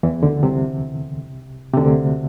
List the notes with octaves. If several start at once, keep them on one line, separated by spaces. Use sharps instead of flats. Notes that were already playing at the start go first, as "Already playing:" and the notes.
E2 E3
D2 D3
C2 C3
C3
D2 D3